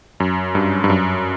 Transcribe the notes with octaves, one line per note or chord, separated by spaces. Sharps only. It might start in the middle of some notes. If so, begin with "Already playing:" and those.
F#2
G2
G2
F#2